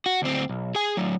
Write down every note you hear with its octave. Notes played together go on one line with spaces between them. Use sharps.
F#4
D2 C4
B1
G#4 G#5
A2 F#3